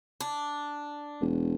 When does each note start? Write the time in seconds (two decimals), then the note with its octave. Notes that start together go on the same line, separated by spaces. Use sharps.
0.20 D4
1.21 E1